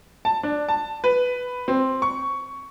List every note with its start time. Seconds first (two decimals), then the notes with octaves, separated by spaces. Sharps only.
0.25 A5
0.43 D4
0.69 A5
1.04 B4
1.68 C4
2.02 C#6